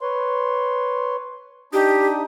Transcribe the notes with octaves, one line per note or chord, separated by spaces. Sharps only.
B4 C#5 C6
D4 D#4 G4 D#6